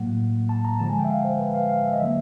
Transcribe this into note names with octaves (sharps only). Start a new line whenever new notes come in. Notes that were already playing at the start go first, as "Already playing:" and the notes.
Already playing: A2 F#3 A#3 F#5
A5
A#5
D3 F3 G#3 A5
G#5
G5
E5
F5
C5
B4
F5
F5
E5
D#5
D3 F#3 A#3 E5